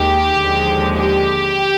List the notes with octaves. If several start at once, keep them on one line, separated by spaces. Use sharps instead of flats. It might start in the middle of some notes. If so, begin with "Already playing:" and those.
Already playing: D#2 D#3 G#3 G4
D#2 D3 F3 G#3
G4